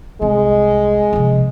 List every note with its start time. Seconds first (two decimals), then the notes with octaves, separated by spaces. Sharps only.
0.22 C2 G#3 C4
1.13 C3 F3